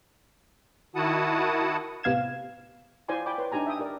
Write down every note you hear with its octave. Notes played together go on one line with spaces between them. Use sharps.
D#3 E4 F#4 F#5 A5 D#6
A2 C3 B3 F5 G#6 E7
E4 F4 C5 D5 G#5 C6
D5 G5 B5 D6
B4 C#5 C6
D4 D#4 G4 G#5 A#5
E5 G5 D#6
G4 A#4 D5